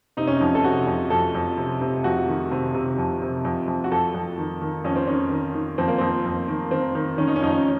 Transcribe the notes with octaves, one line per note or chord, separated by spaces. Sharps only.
C3 D#4
C#4
F2 D#4
A4
C3 F#4
F2
F2 A4
F2
C3
C3
F2 F#4
D#3
C3
C3
F2
C3
F2
F2
F#4
F2 A4
F2
D#3
D#3
F2 C#4
C4
D#3 C#4
D#3
D#3
F2 C4
A#3
F2 C4
F2
D#3
D#3 C4
D#3
D#3 C#4
D#4
C#4
F2 D#4
C#4